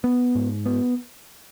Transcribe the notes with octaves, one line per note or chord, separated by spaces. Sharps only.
B3
G#2
B3